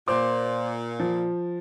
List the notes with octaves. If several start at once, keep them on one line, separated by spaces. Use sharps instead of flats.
A#2 C5 D6
F3